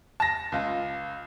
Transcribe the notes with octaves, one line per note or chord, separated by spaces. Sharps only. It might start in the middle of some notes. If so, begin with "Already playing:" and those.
A5 A#6
C#2 F4